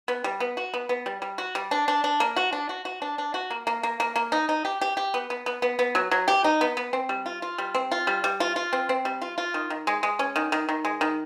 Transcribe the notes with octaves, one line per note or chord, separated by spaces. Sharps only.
B3
G3
B3
F#4
B3
B3
G3
G3
F#4
G3
D4
D4
D4
A#3
F#4
D4
F#4
F#4
D4
D4
F#4
A#3
A#3
A#3
A#3
A#3
D#4
D#4
G4
G4
G4
B3
B3
B3
B3
B3
F#3
F#3
G4
D#4
B3
B3
C4
G3
F4
F4
G3
C4
F4
G3
G3
F4
F4
C4
C4
G3
F4
F4
D#3
D#3
G#3
G#3
C#4
D#3
D#3
D#3
G#3
D#3